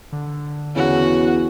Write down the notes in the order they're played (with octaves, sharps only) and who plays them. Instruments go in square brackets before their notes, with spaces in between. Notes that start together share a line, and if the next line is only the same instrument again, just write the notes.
[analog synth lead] D3
[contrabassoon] E2 [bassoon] C#3 [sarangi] F#4